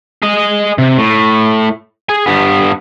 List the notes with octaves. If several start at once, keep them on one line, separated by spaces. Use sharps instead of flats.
G#4 D#5
C3
A2
G#4 G#5
G2 B3